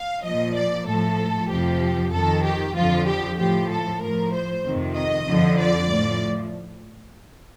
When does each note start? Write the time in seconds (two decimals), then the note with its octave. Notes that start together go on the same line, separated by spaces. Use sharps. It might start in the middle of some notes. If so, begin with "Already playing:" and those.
Already playing: F5
0.24 A#2 F3 D#5
0.56 D5
0.87 A2 F3 A4
1.50 F2 C3 F3 G4
2.13 F2 D#3 A4
2.45 G4
2.76 F2 D3 F3 F4
3.07 G4
3.38 A2 F3 G4
3.70 A4
4.01 A2 F3 A#4
4.33 C5
4.65 F2 C3 D#3
4.96 D#5
5.27 F2 D3 F3
5.59 D5
5.90 A2 F3